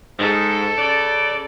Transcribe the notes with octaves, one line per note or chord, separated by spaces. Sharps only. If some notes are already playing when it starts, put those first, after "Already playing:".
G#2 A4
C#3 D5